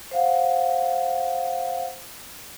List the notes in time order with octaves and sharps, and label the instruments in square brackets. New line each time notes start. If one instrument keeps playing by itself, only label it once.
[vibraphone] C5 F5 F#5